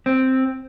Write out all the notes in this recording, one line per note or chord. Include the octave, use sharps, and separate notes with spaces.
C4